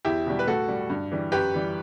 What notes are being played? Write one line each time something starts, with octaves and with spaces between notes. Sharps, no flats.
E2 E4 G4
B2 G3
B4
A2 F#4 A4
G3
G2
E3 G3
F#2 G4 B4
E3 G3